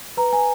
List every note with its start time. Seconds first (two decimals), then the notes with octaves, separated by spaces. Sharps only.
0.17 B4 A#5
0.33 G#5